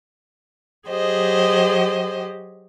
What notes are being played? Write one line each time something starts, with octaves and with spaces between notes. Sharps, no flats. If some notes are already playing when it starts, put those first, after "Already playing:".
F#3 G4 G#4 C5 D#5